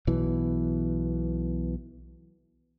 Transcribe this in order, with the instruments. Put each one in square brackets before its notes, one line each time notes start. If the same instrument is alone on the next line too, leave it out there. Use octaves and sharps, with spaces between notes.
[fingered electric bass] B1 B2 E3